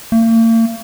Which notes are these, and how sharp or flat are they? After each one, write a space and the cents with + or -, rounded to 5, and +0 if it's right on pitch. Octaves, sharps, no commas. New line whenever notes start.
A#3 -45